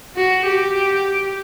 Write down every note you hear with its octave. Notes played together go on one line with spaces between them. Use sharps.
F#4
G4